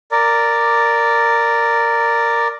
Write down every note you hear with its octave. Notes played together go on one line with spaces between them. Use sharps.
A#4 D5